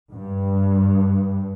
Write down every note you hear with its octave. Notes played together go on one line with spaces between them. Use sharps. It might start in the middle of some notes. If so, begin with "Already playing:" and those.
G2